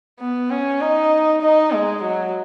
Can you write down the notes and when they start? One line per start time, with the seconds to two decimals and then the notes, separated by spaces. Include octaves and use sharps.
0.20 B3
0.50 C#4
0.80 D#4
1.42 D#4
1.72 G#3
2.03 F#3